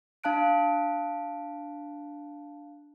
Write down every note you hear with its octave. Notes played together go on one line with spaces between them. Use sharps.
D4 F5 A5 F#6 D7